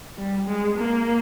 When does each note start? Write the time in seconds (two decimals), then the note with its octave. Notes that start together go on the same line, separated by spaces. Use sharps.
0.17 G3
0.47 G#3
0.77 A#3